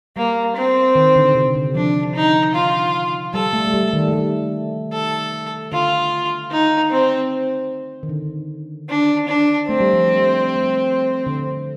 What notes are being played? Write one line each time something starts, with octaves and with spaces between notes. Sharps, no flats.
G3 A#3
C4
D#3
D3
C3
D3
F3 D4
D#4
F4
G3 A4
A3
A3
G3
D#3
A3
G3
A4
D3 F4
D#4
C4
D#3
D3
D4
D4
A3 C4
G3
F3
G3
G3
A3
G3
D3